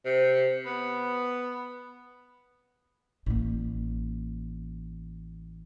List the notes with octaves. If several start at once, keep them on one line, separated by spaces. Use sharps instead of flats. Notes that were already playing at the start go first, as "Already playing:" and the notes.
C3
B3
A1 A#3